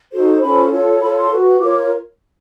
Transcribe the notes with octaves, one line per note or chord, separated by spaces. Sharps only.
D#4 F#4 A4 C5
C#4 F4 A4 C5 B5
F4 A4 C#5
F4 A4 C#5 B5
C6
F#4 B4
F4 A#4 C#5 D6